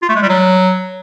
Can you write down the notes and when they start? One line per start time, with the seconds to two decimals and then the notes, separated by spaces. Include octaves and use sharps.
0.02 F4
0.09 A3
0.16 G#3
0.22 G3
0.29 F#3